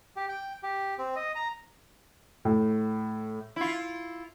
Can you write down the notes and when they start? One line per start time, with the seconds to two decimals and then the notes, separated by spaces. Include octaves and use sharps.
0.16 G4
0.29 G5
0.63 G4
0.98 C4
1.16 D#5
1.36 A#5
2.45 A2
3.56 E4 F4